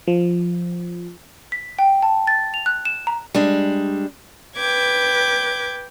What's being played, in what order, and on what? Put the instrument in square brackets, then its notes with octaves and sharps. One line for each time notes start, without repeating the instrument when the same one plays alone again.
[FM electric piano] F3
[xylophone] B6
G5
A5
A6
F7
F#6
E7
A#5
[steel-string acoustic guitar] G3 G#3 D4
[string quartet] B4 G5 D6 G#6